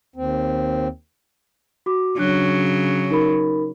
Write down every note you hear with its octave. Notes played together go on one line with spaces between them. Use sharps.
D#2 C4
F#4 D6
C#3 F#3 D4 F#6
D#4 A#4 B5